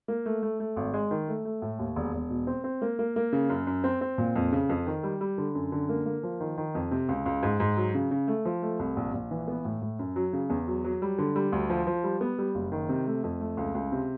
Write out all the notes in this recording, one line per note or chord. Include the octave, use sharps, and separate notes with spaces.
A#3
A3
A3
A3
G#1
G#3
D#3
A3
A3
A2
D#2
E1
E1
B2
C4
C4
A#3
A#3
A#3
C#3
F#2
F#2
C4
C4
A#2
F2
C#3
F2
D#3
G3
G3
D3
F#2
D3
A#3
A#3
F3
D#3
D#3
F2
C3
C#2
C#2
G#2
G#2
F#3
C#3
C#3
A3
F3
A3
C2
A#1
A#1
E3
B3
A2
A2
F#2
F#3
C#3
E2
F#3
F#3
G3
D3
G3
D2
F3
F3
G3
B3
G3
F#1
D#3
C3
A3
F2
A3
C#2
C#2
C3